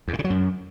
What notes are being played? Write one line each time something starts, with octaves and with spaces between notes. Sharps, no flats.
E2
A2
C#3
F#3
F#2